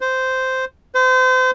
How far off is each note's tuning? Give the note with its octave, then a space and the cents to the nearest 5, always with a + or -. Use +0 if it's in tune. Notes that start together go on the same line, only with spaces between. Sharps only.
C5 -10
C5 -35